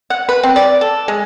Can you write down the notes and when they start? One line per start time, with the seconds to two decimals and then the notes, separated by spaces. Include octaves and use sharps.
0.10 F#5
0.29 B4
0.43 C4
0.56 D5
0.81 A4
1.08 G#3